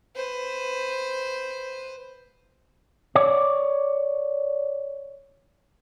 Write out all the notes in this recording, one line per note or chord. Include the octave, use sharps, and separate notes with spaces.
B4 C5
C#5 D5